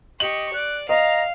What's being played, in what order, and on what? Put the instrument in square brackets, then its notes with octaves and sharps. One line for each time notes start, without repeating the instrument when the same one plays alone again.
[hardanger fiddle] G4 C#6 [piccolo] D#5 [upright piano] F#7
[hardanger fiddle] D5 [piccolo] F#6
[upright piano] D#5 [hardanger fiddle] F5 [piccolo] A#5